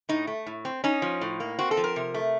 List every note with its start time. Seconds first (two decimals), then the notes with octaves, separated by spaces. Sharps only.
0.09 A2 D#4
0.27 A3
0.46 A2
0.65 C4
0.84 C#4 D#4
1.02 F3
1.21 A2
1.40 A#3
1.59 C4 F#4
1.71 A4
1.77 F3
1.84 A#4
1.96 C3
2.14 A3